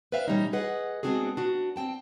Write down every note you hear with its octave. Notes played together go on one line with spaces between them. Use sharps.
B4 C5 D5 E5 F5 G5
A#2 E3 G3 A#3 C#4 D#4
G#4 B4 D#5 F#5
G#3 B3 C4 D4 F#4 G#4
D4 F#4
C4 G5 A5